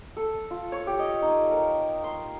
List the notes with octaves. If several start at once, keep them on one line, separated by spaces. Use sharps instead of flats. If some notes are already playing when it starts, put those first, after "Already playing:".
A4
F4
C#5
G4
D#5
D#4
A#4
C6